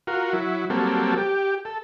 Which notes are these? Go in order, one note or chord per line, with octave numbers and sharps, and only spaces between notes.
F4 F#4 A#4
F#3 E4
F#3 G3 A#3 C4 A4
G4
A4